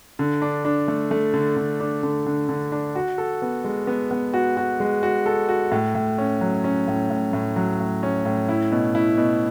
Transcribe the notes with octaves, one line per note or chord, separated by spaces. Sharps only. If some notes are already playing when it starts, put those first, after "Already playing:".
D3
D4
D4
A3
A3
D3
D3
D4
D3
D3
D3
D4
F#4
A4
B3
G#3
B3
B3
F#4
F#4
G#3
F#4
A4
F#4
A2
A2
C#4
F#3
C#4
A2
A2
A2
F#3
A2
C#4
A2
E4
B2
E4
B2